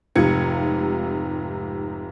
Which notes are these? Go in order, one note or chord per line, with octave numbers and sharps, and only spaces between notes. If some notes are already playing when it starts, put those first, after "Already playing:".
F1 G#2 C3 F4 G#6 C#7